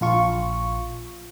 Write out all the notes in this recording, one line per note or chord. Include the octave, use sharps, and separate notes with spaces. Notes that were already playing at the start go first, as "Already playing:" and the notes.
A#1 F4 C#6